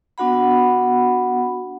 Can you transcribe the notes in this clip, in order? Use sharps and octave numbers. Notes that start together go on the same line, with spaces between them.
B3 D4 F#4 F#5 B5